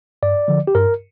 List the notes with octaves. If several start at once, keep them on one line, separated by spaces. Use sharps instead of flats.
G2 D5
D3 F3
G4
G2 A#4